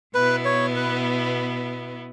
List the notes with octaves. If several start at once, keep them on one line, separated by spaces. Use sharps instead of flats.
B2 B3 E4 B4
C#5
B4